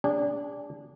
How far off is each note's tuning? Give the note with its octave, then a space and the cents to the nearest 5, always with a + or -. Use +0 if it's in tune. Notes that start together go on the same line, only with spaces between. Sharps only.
D4 -15 G#4 -40